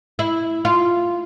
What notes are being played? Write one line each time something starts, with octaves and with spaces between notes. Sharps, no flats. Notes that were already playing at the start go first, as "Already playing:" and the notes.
E4
F4